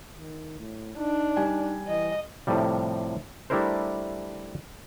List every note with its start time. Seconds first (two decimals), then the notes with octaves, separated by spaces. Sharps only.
0.19 D#3
0.60 A2
0.99 D4 D#4
1.37 G3 G#5
1.88 E3 D#5
2.47 A2 C3 F3 G3
3.50 G3 A3 D4 E4 A#4 C5